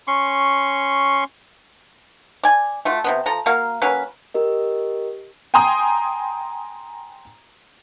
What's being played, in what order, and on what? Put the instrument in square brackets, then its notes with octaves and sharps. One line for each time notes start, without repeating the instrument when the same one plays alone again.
[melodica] C#4 C6 C#6
[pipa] D5 G#5
A3 F4 F#4
C3 F3 B3
F3 A4 A#5
A#3 F#4 A#4 F5
F#3 A#3 C#4 B4
[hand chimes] G4 A#4 D#5
[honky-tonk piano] G5 G#5 A#5 C6 D#6